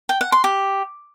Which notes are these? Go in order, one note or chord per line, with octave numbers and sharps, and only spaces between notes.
G5
F#5
C6
G4